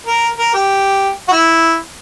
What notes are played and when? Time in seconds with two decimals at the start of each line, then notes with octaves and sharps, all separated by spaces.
0.06 A#4
0.38 A#4
0.54 G4
1.28 F#4
1.32 E4